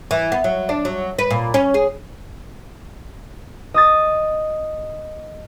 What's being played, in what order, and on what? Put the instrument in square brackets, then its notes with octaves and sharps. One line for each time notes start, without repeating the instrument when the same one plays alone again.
[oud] E3
B3
F#3
D4
F#3
B4
A#2
C#4
G#4
[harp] D#5 D#6 A6